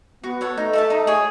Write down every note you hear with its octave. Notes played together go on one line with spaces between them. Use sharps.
B3 F#4
A4 C#5 F#5
A3 D#4
A4 E5 A5
D#4
G#4 C#5